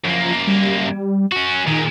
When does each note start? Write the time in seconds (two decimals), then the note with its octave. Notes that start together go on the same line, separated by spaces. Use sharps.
0.04 F#2 F3 A#3
0.47 G3
1.32 C#4 F#4
1.67 A#2 D#3 G#3